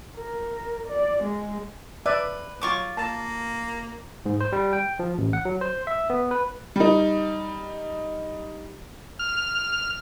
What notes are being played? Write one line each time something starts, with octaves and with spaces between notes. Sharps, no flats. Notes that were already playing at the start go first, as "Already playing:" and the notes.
A#4
D5
G#3
B4 D5 E5
F#3 F4 C#6 D6
A#3 A5
G#2
C5
G3
G5
F3
A1
F#5
F#3
C5
E5
B3
B4
G3 D#4
F6